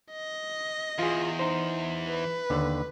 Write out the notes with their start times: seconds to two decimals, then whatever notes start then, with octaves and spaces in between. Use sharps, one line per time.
0.11 D#5
0.99 E2 F4 G#4
1.39 D#4 C5
2.07 B4
2.50 D#2 D3